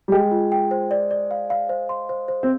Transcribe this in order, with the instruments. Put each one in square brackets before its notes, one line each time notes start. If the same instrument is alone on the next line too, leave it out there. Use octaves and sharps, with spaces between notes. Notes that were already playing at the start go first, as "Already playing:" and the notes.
[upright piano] G3
[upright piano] G#3 [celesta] G5
[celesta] F4
G5
C5
D5
D5
F5
F5
C5
C6
C5
C5
[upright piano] C4